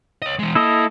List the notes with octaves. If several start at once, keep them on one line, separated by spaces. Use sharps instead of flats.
C#5 D#5
E3 G#3
A#3 E4 A4 D#5